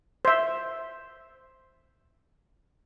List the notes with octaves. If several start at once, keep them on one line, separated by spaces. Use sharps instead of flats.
C5 E5